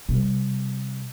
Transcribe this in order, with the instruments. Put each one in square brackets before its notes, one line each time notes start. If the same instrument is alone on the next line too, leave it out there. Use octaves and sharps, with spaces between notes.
[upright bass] C3 G3